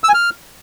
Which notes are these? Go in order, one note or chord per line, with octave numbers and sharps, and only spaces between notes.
E6
G#5
F6